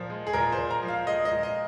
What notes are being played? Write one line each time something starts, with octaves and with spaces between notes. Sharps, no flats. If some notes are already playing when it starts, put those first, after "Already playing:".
Already playing: A#2 F3
G#3
G#4
A#2 A#4
C5
A#2
A#5
F3
F5
G#3 D#5
D#5
A#2
D#5